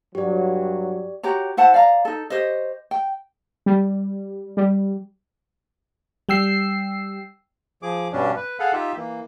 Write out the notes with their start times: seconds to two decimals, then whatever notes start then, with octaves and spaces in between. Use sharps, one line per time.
0.15 G2 F#3 G4 D5
1.23 F#4 G4 C#5 A#5
1.57 E4 C5 F#5 A5
1.74 D5 F5 A#5
2.05 D#4 A4
2.30 G4 C5 C#5 D#5
2.91 G5
3.66 G3
4.57 G3
6.29 G3 G5 E6 C7
7.82 F3 G#4 D6
8.13 G2 B2 G3 C#4 D4
8.36 B4
8.60 G#4 A4 F5 F#5
8.73 D#4 F4 G4 E5
8.96 E3 A#3